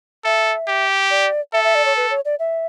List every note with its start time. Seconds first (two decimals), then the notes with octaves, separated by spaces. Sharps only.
0.24 A4 E5
0.68 G4
1.11 D5
1.53 A4 E5
1.64 E5
1.75 D5
1.85 C#5
1.97 B4
2.10 C#5
2.25 D5
2.39 E5